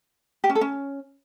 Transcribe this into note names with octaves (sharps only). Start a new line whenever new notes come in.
G4
C#4
A4
C#4